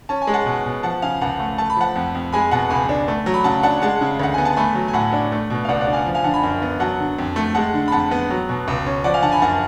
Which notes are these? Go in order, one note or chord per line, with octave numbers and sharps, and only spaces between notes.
C#4 A5
G#5
G#3
F#5 A5
B2
B2
F3 F#5 A5
C#3 F5 G#5
C#2 F#5 A5
A3
A3 A5
B5
F3 F#5 A5
F2
F2
G#3 G#5 B5
B2 F#5 A5
C#2 G#5 B5
D4
A3
F#3
B5
C#3 F#5 A5
D4 F#5 A5
G#3 F#5 A5
C#3
D2 F#5
B3 G#5
A5
A3 G#5 B5
F#3
G#5
A2 F#5 A5
D4
A3
B2
F5
C#2 D5 F#5
D5 F#5
D4
F5 G#5
F3
F5 G#5
D3 F#5 A5
G#5 B5
F#2
B3
F#3 F#5 A5
D3
F2
A3
G#3 F#5 A5
D3
B5
F2 F#5 A5
B3
F#3
B2
C#2
C#4
F3 D5 F#5
F5 G#5
D3 F#5 A5
G#5 B5
F#2 F#5 A5